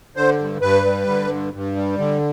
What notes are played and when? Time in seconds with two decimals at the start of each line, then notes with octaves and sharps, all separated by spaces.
0.16 D3 C5
0.39 G2
0.61 G2 B4
0.85 G3
1.07 D3
1.30 G2
1.53 G2
1.76 G3
1.98 D3